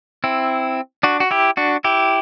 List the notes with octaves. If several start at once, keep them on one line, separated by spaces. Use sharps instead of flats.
C4 E4
D4 F#4
F#4
E4 G4
D4 F#4
E4 G4